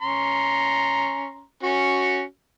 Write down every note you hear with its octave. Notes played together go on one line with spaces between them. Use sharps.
C#4 A#5 C6
C#4 F#4